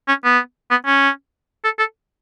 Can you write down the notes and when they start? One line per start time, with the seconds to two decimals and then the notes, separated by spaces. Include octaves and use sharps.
0.08 C#4
0.24 B3
0.71 B3
0.86 C#4
1.64 A4
1.79 A4